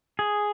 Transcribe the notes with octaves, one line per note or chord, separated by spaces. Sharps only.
G#4